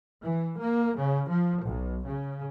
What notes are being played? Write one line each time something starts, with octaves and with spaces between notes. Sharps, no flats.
E3
A#3
C#3
F3
B1
C#3